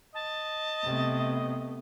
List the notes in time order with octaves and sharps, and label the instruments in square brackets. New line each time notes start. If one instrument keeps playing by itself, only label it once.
[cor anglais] D#5 [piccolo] A5
[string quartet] C3 [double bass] A3 B3